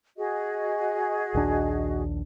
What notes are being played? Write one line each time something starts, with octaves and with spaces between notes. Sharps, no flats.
F#4 G#4 D#5
A#1 D#2 D4